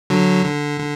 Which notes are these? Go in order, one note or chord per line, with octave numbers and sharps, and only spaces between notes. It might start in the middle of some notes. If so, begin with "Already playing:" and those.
D3 F#3
D3
D3